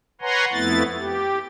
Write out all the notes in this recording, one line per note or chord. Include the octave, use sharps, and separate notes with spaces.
B4 C#5 F#5 G#5 A#5 C6
F2 A3 B3 E4 A6
G4